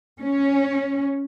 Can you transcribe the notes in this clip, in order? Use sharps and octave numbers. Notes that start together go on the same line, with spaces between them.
C#4